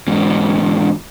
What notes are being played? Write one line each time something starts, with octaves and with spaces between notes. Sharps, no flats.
E2 G#2